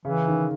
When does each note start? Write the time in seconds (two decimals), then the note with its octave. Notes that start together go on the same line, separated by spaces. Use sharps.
0.05 C#3 E3
0.28 D#3